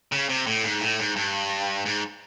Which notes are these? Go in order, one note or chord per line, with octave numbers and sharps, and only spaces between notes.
C#3
C3
A2
G#2
A2
G#2
G2
G#2